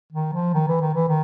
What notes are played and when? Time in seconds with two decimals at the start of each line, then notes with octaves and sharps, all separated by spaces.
0.13 D#3
0.33 F3
0.54 D#3
0.68 E3
0.81 D#3
0.94 E3
1.08 D#3